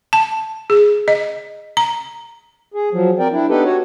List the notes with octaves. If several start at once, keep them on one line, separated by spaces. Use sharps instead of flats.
A5
G#4
D#5
A#5
G#4
F3 F#3
C4 A#4 D5 G5
D4 E4
B3 D4 D#4 G4 A4 B4
F#4 C#5